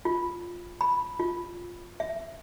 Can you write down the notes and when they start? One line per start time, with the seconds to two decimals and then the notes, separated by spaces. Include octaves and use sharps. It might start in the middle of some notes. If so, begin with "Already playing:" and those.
0.05 F4
0.81 B5
1.20 F4
2.00 E5